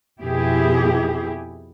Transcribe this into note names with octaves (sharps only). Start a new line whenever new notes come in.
F2 B2 E4 G4 G#4